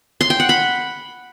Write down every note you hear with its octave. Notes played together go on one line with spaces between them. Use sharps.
C6
G5
F#5
B5